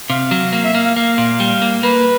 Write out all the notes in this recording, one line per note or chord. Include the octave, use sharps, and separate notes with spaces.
C3 F5
F#3
A#3 F5
E5
A#3 F5
F5
A#3 F5
A#2
G3
A#3
A#3 B4